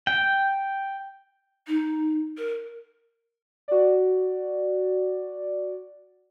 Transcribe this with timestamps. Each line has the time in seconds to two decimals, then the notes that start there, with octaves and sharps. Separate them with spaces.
0.07 G5
1.67 D#4
2.37 A#4
3.68 F#4 D5